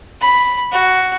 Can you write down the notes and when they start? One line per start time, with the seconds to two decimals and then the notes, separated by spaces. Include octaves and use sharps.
0.21 B5
0.72 F#4